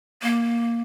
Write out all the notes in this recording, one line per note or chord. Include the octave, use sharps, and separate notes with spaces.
A#3